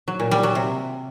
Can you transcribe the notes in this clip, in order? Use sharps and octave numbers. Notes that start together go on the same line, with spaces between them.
F#3
A#2
G3
F#3
C3